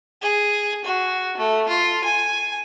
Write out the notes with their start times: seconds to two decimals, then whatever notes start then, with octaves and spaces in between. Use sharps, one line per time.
0.22 G#4
0.85 F#4
1.37 A3
1.68 F4
2.04 G#5